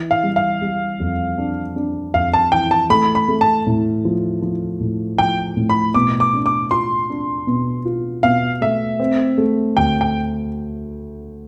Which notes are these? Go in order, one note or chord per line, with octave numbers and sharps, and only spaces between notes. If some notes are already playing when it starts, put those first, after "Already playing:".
Already playing: E3
F5
G3
F5
G3
F2
D4
D4
F2 F5
A5
E3 G5
A5
A3 B5
B5
A3
A5
A2
F3
F3
A2
F3 G5
A2
B5
B2 D6
D6
D4
D6
F4 C6
D4
B2
F4
B2 F5
A3 E5
C4
A3
D2 G5
G5